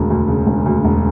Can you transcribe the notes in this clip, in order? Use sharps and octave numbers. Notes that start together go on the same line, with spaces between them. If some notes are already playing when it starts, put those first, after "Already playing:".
Already playing: E1 D2 C#3
D2
C#3
E1
D2
E1